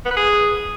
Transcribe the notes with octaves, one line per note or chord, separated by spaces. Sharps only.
B3
B4
G#4